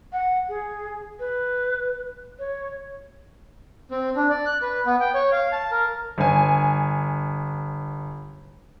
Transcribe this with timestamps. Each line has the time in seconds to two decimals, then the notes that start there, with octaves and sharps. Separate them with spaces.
0.13 F#5
0.49 G#4
1.19 B4
2.39 C#5
3.91 C4
4.16 D4
4.30 D5
4.46 F#6
4.62 B4
4.86 B3
5.00 G5
5.14 C#5
5.32 F5
5.52 A5
5.71 A#4
6.18 G1 G#5